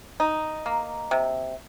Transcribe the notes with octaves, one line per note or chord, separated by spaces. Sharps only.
D#4
A#3
C3